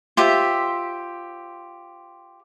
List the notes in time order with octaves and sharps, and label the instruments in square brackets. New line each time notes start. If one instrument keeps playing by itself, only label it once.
[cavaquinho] F4 G4 C5 E5